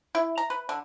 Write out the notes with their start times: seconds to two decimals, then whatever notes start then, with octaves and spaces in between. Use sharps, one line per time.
0.15 E4
0.38 A#5
0.50 B4
0.69 D3